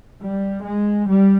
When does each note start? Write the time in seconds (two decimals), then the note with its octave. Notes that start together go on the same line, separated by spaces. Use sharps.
0.22 G3
0.66 G#3
1.10 G3